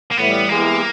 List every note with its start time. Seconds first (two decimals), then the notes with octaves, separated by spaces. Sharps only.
0.11 A#3
0.17 A2 E3 G3 B3
0.49 E3 G#3 A#3 B3 E4 G4